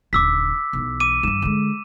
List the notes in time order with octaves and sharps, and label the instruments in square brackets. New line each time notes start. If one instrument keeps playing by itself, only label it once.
[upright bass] D#1 D3 [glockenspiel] D6 E6 B6
[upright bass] B1 E3
[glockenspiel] D6 D#7
[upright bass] G2 E3 [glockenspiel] E7
[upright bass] D3 G#3